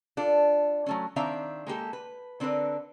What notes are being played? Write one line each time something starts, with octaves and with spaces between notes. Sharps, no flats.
D4 F4 A4
F#3 A3 C#4
D#3 C4 D4 E5 F5 A#5
G#3 A#3 G4 A4
B4
D3 C4 D4 A#4 B4